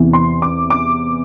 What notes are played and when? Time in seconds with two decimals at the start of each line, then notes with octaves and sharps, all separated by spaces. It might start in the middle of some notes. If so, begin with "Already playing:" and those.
Already playing: E2 C3 E3
0.13 C6
0.42 D6
0.70 D6